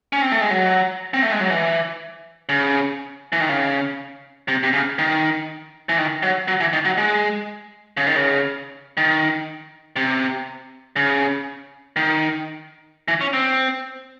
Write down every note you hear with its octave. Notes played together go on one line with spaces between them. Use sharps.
C#4
C4
A3
G#3
F#3
C4
A3
G#3
F#3
E3
C#3
E3
D#3
C#3
C3
C3
C#3
D#3
E3
D#3
F#3
F#3
E3
D#3
F#3
G#3
C#3
D#3
C#3
D#3
C3
C#3
D#3
E3
C#4
C4